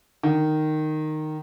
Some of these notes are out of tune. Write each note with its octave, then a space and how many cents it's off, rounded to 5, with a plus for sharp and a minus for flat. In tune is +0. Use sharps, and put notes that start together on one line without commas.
D#3 -10